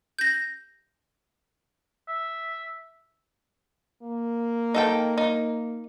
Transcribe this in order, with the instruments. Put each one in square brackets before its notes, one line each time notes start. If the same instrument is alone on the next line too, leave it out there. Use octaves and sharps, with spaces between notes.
[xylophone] G6 A#6
[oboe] E5
[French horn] A#3
[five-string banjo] D#4 A4 G5
D#4